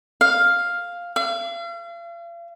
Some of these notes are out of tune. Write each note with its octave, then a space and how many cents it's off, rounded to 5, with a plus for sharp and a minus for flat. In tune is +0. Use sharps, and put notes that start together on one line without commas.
F5 +5
F5 -40